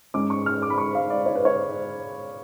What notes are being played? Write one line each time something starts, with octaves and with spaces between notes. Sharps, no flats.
G#2 G#3 C#4 D6
C#6
F6
D6
B5
C#6
F5
D5
C#5
B4
C#5